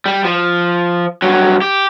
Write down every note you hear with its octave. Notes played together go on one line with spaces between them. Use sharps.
G3
F3
G2 F#3
G4